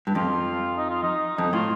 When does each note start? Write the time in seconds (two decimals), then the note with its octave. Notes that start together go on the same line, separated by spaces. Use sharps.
0.07 G2
0.15 F2 F4
0.77 D#4
0.90 F4
1.03 D#4
1.38 F2 D#4
1.53 A2 F4